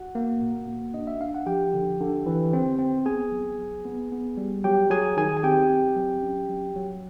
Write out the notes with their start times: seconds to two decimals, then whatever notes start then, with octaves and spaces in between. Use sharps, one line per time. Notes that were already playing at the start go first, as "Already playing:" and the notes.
Already playing: F#4 F#5
0.15 A#3
0.41 A#2
0.68 A#3
0.94 D4 D#5
1.07 E5
1.20 D4 F5
1.35 F#5
1.46 F3 G4 G5
1.74 D3
2.00 D3
2.26 E3
2.53 C4
2.79 C4
3.06 B3 G#4 G#5
3.32 F#3
3.59 F#3
3.85 B3
4.12 B3
4.37 G3
4.64 F#3 G4 G5
4.90 F#3 G#4 G#5
5.17 D#3 G#4 G#5
5.37 G#5
5.43 C4 G4 G5
5.70 C4
5.96 F#3
6.23 C#4
6.49 F#3
6.76 F#3